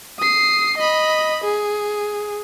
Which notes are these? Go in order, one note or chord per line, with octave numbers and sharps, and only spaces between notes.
D#6 C7
D#5 B5
G#4